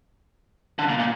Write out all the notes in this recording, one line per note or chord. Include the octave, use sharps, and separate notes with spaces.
D3
A#2
A#2